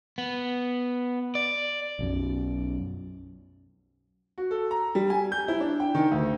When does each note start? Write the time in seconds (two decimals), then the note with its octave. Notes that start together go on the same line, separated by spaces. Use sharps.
0.18 B3
1.35 D5
1.99 B1 F#2
4.38 F#4
4.51 A4
4.71 A#5
4.95 G3
5.10 G#5
5.32 G6
5.48 E4
5.60 D4
5.80 G5
5.95 D#3
6.11 D2